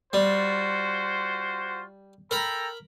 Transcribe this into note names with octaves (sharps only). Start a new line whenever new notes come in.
G3 F4 F#4 C5
A4 A#4 G5 A#5 B5